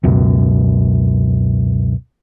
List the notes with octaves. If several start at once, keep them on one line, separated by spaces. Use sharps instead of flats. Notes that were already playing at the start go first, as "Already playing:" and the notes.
C#2 F#2 B2